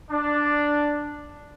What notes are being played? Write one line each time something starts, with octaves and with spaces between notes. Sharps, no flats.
D4